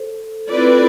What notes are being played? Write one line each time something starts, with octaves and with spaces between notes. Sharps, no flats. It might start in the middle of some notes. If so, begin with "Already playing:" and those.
Already playing: A4 C5
C4 E4 F4 A4 B4 D5